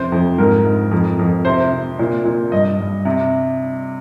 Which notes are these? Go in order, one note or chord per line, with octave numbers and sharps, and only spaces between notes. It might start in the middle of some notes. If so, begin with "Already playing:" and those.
Already playing: F2 C3 C5
F2
G#2 A#4
G#2
F2
F2
C3 C5
C3
A#2
A#2
G2 D#5
G2
C3